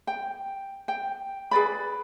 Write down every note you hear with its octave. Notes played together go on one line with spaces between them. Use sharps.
G5
G5
G#4 B4 D5 B5